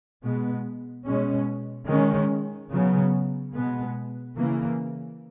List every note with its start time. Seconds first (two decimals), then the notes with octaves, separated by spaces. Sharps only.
0.22 B2 G#3 B3
1.05 B2 G#3 C#4
1.87 D#3 G#3 C#4
2.70 C#3 F#3 B3
3.54 B2 G#3 B3
4.36 C#3 E3 A#3